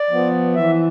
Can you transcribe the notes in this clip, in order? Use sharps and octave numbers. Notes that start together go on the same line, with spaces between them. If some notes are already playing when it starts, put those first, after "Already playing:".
Already playing: D5
F3 B3
E3 E5